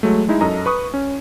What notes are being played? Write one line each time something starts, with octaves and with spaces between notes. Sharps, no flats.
F#3 G#3 A3
G#3 D#4 E4
F#2 A4 D#5 A#5
B4 C#6 D#6
C#4